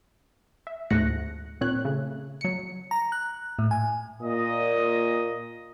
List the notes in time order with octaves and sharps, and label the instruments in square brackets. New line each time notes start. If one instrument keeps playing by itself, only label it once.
[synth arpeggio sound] E5
D2 G#2 A3 F#6 A#6 C#7
A#2 C4 C#5 F#6
C#3 A3
F#3 C#7
[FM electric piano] A#5
F#6
A2
G#5
[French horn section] A#2 [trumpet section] D#5 D#6